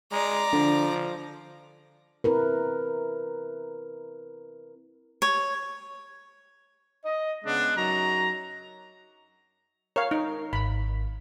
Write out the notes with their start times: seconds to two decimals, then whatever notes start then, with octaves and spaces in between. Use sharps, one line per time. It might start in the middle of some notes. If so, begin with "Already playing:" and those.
0.12 G#3 D5 A#5
0.53 D3 F3
2.24 C4 E4 A#4 B4
5.22 C#5
7.05 D#5
7.45 C#3 G#3 B3 D4
7.77 F#2 F#3 D#4 A#5
9.96 A#4 C#5 F5
10.11 D#4
10.53 G#1 B5 B6